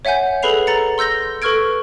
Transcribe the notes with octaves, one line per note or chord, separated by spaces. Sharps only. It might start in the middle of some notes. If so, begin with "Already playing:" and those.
C#5 E5 F#5 G#5 G6
G#4 A4 B4 B5 C7 F7
A4 A#5 A6 C#7
C6 E6 G6 A#6 G7
A4 B4 C#6 F6 G#6 D7